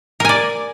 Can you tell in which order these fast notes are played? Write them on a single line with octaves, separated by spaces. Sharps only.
A#4 G#5 D5